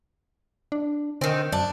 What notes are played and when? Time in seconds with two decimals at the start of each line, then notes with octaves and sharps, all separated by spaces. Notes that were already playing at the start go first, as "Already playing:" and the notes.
0.72 D4
1.21 D3 D#3 C4
1.52 F#2 D4